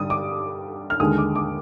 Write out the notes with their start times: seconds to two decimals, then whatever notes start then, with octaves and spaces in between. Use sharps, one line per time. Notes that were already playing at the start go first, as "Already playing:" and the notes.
Already playing: G2 D3 G3 D#6
0.10 D6
0.90 F6
1.00 D#2 D3 G#3 D#6
1.18 D6
1.35 D6